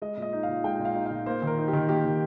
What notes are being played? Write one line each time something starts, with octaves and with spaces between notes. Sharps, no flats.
G#3 D#5
A#2 D#5
D#4
F5
A#2
G#3 G5
A#2
F5
D#4
A#2 F5
A#3 C5
D#3
A#4
D#4
G4
D#3
A#3 G4
D#3